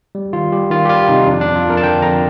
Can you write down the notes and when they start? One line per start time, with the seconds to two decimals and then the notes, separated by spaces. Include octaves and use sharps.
0.15 G3
0.33 D#3 F4
0.52 G3 G4
0.71 D#3 F4
0.86 G4
0.90 G3 F4
1.08 C3 D#4
1.27 F2 D4
1.41 D4
1.47 F2
1.56 F4
1.65 F2 A#4
1.77 A5
1.83 D3 G5
2.02 F2 A#5